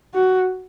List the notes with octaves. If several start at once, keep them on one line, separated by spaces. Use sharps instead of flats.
F#4